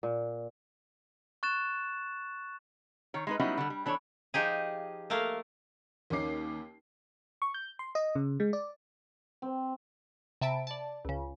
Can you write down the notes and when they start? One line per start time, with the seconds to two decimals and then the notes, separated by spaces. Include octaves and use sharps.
0.03 A#2
1.43 C#6 F#6 A6 E7
3.14 D#3 C#5
3.27 G#3 D#4 B4
3.39 F#3 G3 B3 C#4 D#4 E4
3.58 D3 G3
3.70 G3
3.86 E3 D4 A4 C#5
4.34 F3 D#4 G4 G#4
5.10 A3 A#3 A#4 F5
6.10 D#2 A#3 C#4 D#4 D6 C7
7.42 C#6
7.54 G6
7.79 C6
7.95 D#5
8.15 C#3
8.40 G#3
8.53 D5
9.42 C4
10.41 C3 E5 A5 B5 D7
10.67 D5 A5
11.05 C#2 C#3